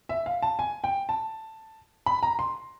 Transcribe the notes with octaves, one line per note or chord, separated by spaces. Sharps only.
E5
F5
A5
G#5
G5
A5
B5
A#5
C6